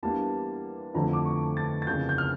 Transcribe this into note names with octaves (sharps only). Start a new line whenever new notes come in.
E2 E3 G3 A#3 D4 A5
F2 D3 F3 A3 E4 A#5
D6
C#6
A6
A6
F2 C#3 E3 A#3 G6
G6
F6